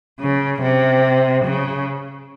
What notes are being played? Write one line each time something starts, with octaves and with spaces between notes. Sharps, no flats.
C#3
C3
C#3